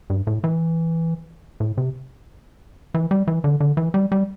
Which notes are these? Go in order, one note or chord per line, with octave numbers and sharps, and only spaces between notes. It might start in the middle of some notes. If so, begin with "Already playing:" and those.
G2
A2
E3
A2
C3
E3
G3
E3
D3
D3
E3
G3
G3